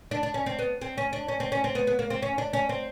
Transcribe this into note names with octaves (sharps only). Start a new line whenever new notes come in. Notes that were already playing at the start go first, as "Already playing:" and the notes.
D4
D4
C#4
C4
B3
C4
C#4
D4
C#4
C4
C#4
C4
B3
B3
A#3
C4
C#4
D4
C#4
C4